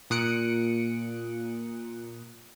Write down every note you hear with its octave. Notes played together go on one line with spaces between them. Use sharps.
A#2 D#6 F#6 C#7 D7